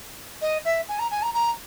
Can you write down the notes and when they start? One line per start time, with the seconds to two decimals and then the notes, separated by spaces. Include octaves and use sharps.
0.41 D#5
0.64 E5
0.88 G#5
0.99 A#5
1.10 G#5
1.22 A#5
1.33 A#5